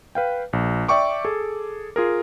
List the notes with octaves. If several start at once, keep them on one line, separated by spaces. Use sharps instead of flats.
B4 F5 G5
A#1
D5 E5 G5 C#6 D6
G#4 A4
F4 G#4 A#4